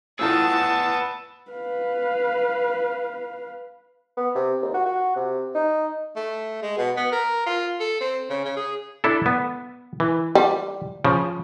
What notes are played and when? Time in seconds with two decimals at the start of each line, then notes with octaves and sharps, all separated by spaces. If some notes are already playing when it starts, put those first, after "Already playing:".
0.19 A2 B3 F4 G#4 A4 A5 E6
1.51 B4 F5
4.17 B3
4.35 C3
4.62 D#2
4.74 F#4
4.86 F#4
5.16 C3
5.55 D#4
6.16 A3
6.63 G#3
6.78 B2
6.97 B3
7.12 A#4
7.47 F4
7.80 A4
8.01 C4
8.30 C#3
8.45 C#3
8.57 G#4
9.04 D4 E4 A4
9.26 B3
10.00 E3
10.35 G3
11.04 C#3 F3